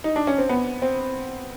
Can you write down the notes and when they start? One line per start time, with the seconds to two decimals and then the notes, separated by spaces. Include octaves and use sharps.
0.04 D#4
0.16 D4
0.27 C#4
0.38 C4
0.49 B3
0.82 C4